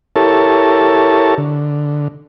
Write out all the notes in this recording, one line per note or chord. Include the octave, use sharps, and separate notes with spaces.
E4 G4 A4 A#4 C#5 A5
D3